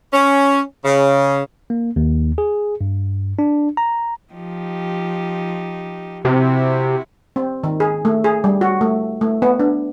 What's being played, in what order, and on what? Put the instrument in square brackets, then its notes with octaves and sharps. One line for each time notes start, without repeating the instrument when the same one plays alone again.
[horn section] C#4
C#3
[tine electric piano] A#3
D#2
G#4
G2
D4
A#5
[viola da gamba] F3 D#4 G4
[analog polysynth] C3 [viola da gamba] E4 F#4
[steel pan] C4
D#3
G#4
A3
G#4
G3
F#4
A3
A3
B3
D4